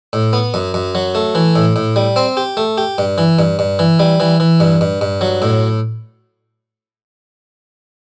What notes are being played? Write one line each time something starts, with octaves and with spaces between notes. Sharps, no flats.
A2
B3
F#2
F#2
F#3
A3
E3
A2
A2
G3
C4
G4
A3
G4
G2
E3
G2
G2
E3
G3
E3
E3
G2
G2
G2
F#3
A2